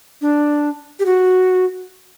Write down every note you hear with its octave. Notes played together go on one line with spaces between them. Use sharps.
D4
G4
F#4